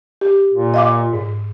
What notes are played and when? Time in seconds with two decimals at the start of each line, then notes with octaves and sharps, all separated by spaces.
0.21 G4
0.54 A#2
0.74 D#5 F5 D6
1.13 G#2